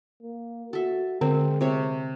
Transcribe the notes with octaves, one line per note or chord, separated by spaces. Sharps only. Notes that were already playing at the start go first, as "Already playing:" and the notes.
A#3
F#4 A4 E5
D3 G#3 C4
C3 C#5